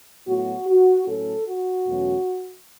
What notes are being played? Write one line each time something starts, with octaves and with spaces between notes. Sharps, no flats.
A2 F#3 B3 F#4
F#4
A2 F#3 C#4 A4
F#4
E2 B2 F#3 A3 C#4